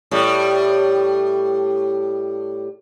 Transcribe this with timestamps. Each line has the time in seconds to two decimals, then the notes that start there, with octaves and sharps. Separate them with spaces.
0.11 A2 G3